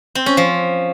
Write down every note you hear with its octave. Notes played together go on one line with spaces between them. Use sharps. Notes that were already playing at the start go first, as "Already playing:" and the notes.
C4
C#4
F3